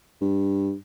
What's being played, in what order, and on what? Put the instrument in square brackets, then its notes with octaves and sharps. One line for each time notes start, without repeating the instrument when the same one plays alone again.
[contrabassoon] G2